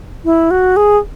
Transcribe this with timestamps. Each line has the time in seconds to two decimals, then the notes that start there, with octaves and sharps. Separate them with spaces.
0.25 E4
0.51 F#4
0.76 G#4